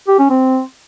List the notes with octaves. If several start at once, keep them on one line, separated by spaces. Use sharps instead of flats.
G4
C#4
C4